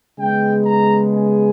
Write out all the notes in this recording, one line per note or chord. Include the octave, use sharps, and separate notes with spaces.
C#3 G#3 B3 G5
A#5
G#5